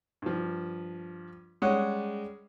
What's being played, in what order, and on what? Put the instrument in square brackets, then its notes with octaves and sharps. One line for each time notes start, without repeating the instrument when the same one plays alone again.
[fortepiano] G2 F3
G3 G#3 C#4 G#4 C#5 F#5